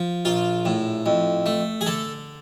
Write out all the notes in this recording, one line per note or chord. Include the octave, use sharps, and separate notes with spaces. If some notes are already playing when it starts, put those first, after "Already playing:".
Already playing: F3
A#1 F4
A2
F2
A3
G#4
D3 A4